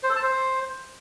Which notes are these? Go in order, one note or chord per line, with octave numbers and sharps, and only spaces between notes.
C5
A4
A5
C5